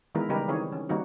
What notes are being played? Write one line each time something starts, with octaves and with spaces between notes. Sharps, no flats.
D#3 E3 G#3 B3 E4 A#4
C#3 G3 D#4 G4 A#4 B4
D#3 E3 C4 G#4 C#5
C#4
D#3 G3 A#3 C4 D#4 F#4